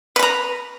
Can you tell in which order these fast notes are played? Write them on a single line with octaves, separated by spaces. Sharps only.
B4 B5 A#5